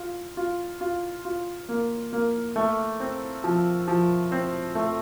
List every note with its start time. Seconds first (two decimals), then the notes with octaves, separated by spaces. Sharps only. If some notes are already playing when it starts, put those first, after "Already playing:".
Already playing: F4
0.37 F4
0.81 F4
1.25 F4
1.69 A#3
2.13 A#3
2.56 A3
3.00 C4
3.44 F3
3.88 F3
4.32 C4
4.75 A3